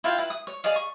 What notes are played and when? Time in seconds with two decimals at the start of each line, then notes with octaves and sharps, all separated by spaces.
0.04 E4 F4 F5 G5
0.18 E4 B4
0.30 D#6
0.47 C#5
0.64 G#4 D5 D#5 F5
0.76 C#6